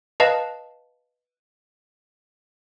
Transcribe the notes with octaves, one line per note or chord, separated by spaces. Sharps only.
B4 D#5 F5 A5